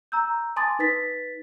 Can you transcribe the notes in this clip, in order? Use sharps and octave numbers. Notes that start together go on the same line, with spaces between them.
A#5 E6 G6
G#5 A5 C6 D6 D#6 A6
D#4 B4 A6 B6